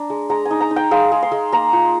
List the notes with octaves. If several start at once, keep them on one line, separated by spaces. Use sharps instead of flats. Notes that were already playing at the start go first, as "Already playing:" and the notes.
Already playing: D4 A#5
G#3
G#3 A#5
G#5
D#4
A#5
D#4
G5
G#3 F5
G#3
C6
G#3
A#3 A#5
F4